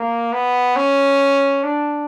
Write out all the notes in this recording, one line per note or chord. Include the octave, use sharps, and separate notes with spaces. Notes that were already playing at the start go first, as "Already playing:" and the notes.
Already playing: A#3
B3
C#4
D4